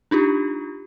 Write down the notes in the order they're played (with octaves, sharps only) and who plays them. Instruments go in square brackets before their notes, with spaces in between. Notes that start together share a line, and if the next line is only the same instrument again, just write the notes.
[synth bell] D4 D#4 F4 G4